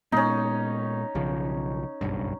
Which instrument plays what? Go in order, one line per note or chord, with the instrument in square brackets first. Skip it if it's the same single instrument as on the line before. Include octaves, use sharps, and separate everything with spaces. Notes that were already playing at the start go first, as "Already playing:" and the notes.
[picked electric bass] A#2 G#3 B3 [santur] C#4 D#4
[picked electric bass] B1 C#3 F3
F#1 B1 G2